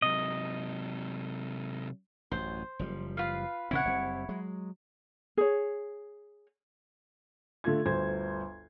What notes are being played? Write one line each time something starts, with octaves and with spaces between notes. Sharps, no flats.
C3 F#3 D#5
A1 F#2 C5
F#1 F3 G3
F4 B4 F5
A#1 C#3 C4 E4 C#5 F#5
F#1 G3 C4
F#3 G#3
G#4 C#5
D3 A3 F4 G#6
G1 D2 C5 G#6